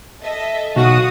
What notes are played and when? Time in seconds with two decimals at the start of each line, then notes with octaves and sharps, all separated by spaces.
0.22 A4 D#5 E5
0.76 B1 F#4 F5 D#6